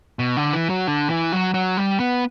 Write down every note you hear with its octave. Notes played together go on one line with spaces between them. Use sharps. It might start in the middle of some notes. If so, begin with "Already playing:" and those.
B2
D3
E3
F#3
D3
E3
F#3
F#3
G3
B3